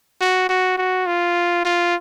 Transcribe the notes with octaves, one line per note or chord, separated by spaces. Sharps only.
F#4
F#4
F#4
F4
F4